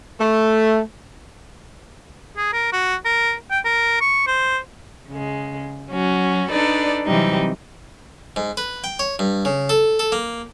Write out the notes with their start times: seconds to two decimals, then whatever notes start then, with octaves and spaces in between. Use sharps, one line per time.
0.20 A3
2.37 G#4
2.53 A#4
2.72 F#4
3.05 A#4
3.50 G5
3.65 A#4
4.01 C#6
4.27 C5
5.08 C#3 G#3
5.90 F#3 C#4 F#4
6.49 D4 D#4 A4 B4 D5
7.06 C3 E3 F#3 G3 C4 D#4
8.36 G#2
8.57 B4
8.84 G5
8.99 C#5
9.19 G2
9.45 C#3
9.69 A4
9.99 A4
10.12 A#3